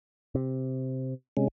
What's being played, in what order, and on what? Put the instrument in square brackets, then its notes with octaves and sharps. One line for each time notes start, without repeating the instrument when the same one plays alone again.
[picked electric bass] C3
[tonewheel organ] C3 G#3 C#4